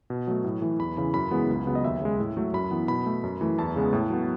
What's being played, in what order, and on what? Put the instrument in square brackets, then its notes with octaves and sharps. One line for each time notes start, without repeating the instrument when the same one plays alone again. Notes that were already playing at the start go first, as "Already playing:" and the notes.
[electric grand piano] B2
F#3 A3
A2
E3 A3
E2 B5
C#3 E3 B5
F#2 B5
C#3 E3 G#3 B3
C#2
C#3 F#3 B3
D#5
D#2 E5
C#3 G#3
A2
F#3 A3
F#2 B5
E3 B3
B2 B5
A3
F#2
E3 A3
E2 A5
C#3 G#3 B3
A2
F#3 B3